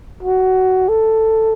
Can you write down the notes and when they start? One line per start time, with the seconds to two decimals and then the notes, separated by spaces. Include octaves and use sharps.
0.23 F#4
0.89 A4